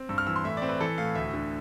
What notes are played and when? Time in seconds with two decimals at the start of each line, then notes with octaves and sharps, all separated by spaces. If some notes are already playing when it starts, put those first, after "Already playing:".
Already playing: C4
0.09 G2 E6
0.18 F6
0.27 E3 E6
0.36 C6
0.44 A2 E5
0.57 C4 D5
0.69 B4
0.80 E3 A4
0.98 A2 F5
1.15 D2 E5
1.34 D3